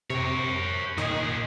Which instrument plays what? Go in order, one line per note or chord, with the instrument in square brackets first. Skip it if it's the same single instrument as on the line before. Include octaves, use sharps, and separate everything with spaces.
[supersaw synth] C3 [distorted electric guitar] A#4 C#5
[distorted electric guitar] A#2 G#4 [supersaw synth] D#3 D#5